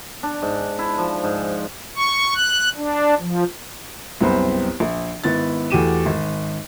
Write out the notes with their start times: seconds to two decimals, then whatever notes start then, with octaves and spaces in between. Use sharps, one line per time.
0.23 D4
0.42 G#2
0.79 E4
0.98 F3
1.24 G#2
1.96 C#6
2.35 F#6
2.77 D4
3.19 F3
4.21 C2 F#2 B3 C4 C5 B5
4.80 A#1
5.24 G#1 B3 E4 A6
5.70 E2 A3 F#4 G4 D#7 E7
6.06 G#1